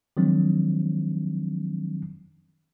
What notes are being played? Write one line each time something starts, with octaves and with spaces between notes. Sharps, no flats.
D#3 F3 F#3 G#3 C4 D4